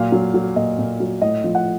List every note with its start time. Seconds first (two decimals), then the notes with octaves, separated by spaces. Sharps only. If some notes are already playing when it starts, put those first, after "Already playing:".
Already playing: A#2 F#3 F5
0.12 F#3
0.34 F#3
0.56 A#2 D#5
0.79 A#2
1.00 F#3
1.22 A2 D#5
1.44 F3
1.55 F#5